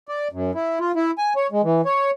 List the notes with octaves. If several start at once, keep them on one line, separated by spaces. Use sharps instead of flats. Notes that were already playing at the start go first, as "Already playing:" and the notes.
D5
F#2
E4
F4
E4
G#5
C#5
G#3
E3
C#5